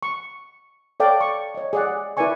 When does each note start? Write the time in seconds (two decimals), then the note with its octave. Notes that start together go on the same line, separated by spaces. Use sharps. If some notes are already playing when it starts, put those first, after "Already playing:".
0.03 C#6
1.00 A4 C#5 D5 F5 G5
1.21 C#6
1.55 C#5 D#5
1.73 G#4 D5 F#5
2.17 E4 A#4 B4 D5 G#5 C#6